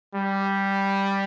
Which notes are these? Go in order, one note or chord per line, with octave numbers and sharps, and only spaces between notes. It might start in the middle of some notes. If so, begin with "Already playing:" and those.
G3